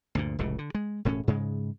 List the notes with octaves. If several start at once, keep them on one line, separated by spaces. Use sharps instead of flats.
D2 G2 A#2
F1 C#2 A2 C#3
D3
G#3
E1 A2 B3 C#4
G#2 C#3 G#3